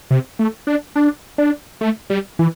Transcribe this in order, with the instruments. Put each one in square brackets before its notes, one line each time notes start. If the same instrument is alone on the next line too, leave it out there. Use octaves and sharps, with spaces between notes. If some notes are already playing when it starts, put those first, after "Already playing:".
[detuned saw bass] C3
A3
D4
D4
D4
A3
G3
E3